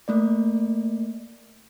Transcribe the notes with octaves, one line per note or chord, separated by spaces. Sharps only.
A3 A#3 D5